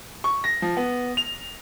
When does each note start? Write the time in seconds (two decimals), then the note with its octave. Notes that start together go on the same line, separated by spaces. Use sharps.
0.24 C#6
0.44 A#6
0.62 F3
0.77 B3
1.17 F7